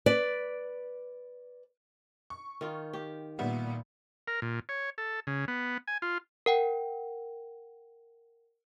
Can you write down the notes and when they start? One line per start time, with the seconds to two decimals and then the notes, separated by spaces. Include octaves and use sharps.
0.06 B4 D5
2.30 C#6
2.61 D#3 F4
2.93 G4
3.39 A#2 D#3 G3 B3 E5
4.28 A#4
4.42 A#2
4.69 C#5
4.98 A4
5.27 C#3
5.48 B3
5.88 G#5
6.02 F4
6.46 A#4 F#5 G5